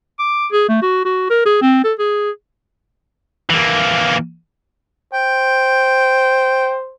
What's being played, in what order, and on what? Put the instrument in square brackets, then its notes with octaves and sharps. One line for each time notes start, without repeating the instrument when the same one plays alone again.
[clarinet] D6
G#4
A3
F#4
F#4
A#4
G#4
C4
A4
G#4
[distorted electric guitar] E3 A#3
[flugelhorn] C5 [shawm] G5